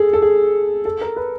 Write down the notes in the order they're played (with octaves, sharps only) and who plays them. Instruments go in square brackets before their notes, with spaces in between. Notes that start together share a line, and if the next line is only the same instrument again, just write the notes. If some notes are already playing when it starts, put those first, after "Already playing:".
Already playing: [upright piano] G#4 A4
A4
G#4
A4
A#4
B4